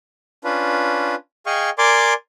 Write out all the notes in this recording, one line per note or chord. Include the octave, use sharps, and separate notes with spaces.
C#4 D4 F4 B4
G#4 D#5 F5 G5 G#5 C#6
A#4 D5 G#5 C6 D6